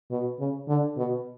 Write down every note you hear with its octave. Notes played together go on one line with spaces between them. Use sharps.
B2
C#3
D3
B2